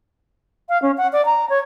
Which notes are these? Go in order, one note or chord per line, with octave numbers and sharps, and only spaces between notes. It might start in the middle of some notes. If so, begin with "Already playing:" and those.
F5
C#4
F#5
D5
A#5
C#5